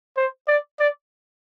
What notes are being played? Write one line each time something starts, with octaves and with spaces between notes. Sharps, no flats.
C5
D5
D5